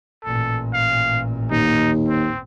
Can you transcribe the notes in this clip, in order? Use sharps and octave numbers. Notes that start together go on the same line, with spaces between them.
A1 A#2 A4
F5
D#2 D#4
C4